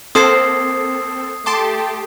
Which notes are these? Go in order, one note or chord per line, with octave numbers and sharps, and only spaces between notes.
A#3 C4 A4 C5 D#6 G#6 C7
A3 G4 A5 C6 D6